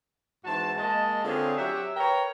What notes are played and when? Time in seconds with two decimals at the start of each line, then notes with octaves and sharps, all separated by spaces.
0.45 G#2 E3 C4 F#4 A5
0.77 G#3 A#3 D#5 A5
1.24 D3 C4 C#4 F4 G#4
1.57 F#3 G4 E5
1.97 A#4 B4 C#5 G5 A#5